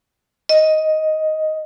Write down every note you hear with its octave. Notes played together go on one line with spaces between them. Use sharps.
D#5